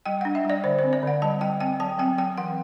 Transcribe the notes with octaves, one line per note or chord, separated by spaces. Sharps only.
G3 G5
D4 F#5
E5
G3 D5
D3 C5
C4 C5
D5
D3 F#5
G3 A5
G3 G5
C4 G5
F#3 A5
C4 G5
F#3 G5
E3 F#5